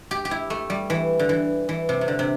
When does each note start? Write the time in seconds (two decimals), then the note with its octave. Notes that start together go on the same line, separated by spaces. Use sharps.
0.11 G4
0.25 G4
0.31 E4
0.50 A3
0.70 G3
0.90 E3
1.19 D3
1.29 E3
1.69 E3
1.89 C3
2.01 C3
2.08 D3
2.19 C3